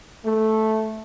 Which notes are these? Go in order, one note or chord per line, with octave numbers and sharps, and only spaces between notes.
A3